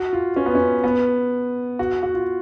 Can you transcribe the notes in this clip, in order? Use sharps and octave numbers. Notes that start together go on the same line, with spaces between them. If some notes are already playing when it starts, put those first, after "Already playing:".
Already playing: F#4
F4
C#4
B3
C#4
B3
F#4
F#4
F4